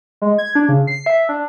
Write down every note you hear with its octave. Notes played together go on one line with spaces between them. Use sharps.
G#3
G#6
D4
C#3
C7
E5
D4